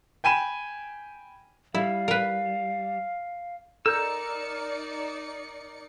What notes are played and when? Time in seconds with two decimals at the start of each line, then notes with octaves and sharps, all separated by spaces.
0.24 G5 G#5 B5 D#7 E7
1.75 G3 E4 F5
2.08 A#4 B4
3.86 D#4 A4 A#4 D5 E6 G6 C#7